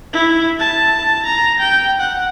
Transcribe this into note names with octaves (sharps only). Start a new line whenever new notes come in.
E4
A5
A#5
G5
F#5